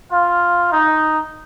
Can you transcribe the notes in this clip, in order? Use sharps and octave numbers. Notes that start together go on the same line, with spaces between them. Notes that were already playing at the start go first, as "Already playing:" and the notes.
F4 F5
D#4